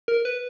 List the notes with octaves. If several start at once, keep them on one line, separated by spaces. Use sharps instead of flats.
A#4
B4